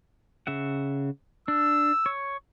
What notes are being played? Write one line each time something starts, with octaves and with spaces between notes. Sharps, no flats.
C#3 E5 F#5
D4 E6
C#5